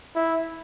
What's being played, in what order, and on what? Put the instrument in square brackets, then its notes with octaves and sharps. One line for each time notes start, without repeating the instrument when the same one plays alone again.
[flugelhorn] E4